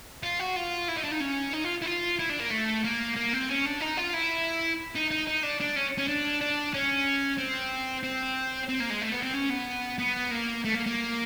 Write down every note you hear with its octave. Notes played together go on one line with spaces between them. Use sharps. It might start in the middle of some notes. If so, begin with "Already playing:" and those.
F4
F#4
F4
E4
D#4
D4
D#4
C#4
D#4
F4
E4
F4
E4
D4
A#3
A3
A#3
A#3
C4
C#4
D4
D#4
F4
E4
D#4
D#4
D#4
D4
D4
C#4
C#4
D4
D4
C#4
C4
C4
C4
A#3
G#3
A3
B3
C4
C#4
B3
B3
A#3
A3
A#3
A#3